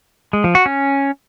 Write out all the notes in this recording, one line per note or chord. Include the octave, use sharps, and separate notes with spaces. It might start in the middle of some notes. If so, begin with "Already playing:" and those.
G#3
F3
F#4
C#4